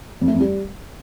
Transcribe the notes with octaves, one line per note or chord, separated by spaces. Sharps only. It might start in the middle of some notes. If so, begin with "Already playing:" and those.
F2
A3
F2
G3